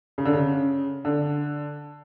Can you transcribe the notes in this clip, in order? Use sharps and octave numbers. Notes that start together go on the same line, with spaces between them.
C#3
D3
C#3
D3